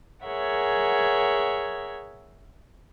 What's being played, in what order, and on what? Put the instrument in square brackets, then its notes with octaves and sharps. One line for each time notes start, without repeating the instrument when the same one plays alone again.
[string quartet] G#4 A#4 C#5 E5 F#5